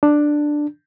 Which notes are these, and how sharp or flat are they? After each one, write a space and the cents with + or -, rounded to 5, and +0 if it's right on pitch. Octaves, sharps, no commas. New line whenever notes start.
D4 +10